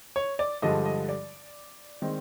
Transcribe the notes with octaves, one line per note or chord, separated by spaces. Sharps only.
C#5
D5
G2 D3 F3 G#3 D#5
D#5
D5
D#3 G#3 C4